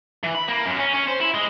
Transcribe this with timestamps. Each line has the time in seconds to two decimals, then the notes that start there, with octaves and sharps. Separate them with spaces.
0.24 E3
0.35 B5
0.48 A#3
0.66 F#2
0.79 C#4
0.94 C#4
1.08 C5
1.21 E4
1.34 G#3